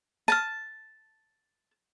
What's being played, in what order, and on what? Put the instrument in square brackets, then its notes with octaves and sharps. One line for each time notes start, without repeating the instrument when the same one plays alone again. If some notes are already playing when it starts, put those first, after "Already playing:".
[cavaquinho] A5 [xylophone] F6 A6 D#7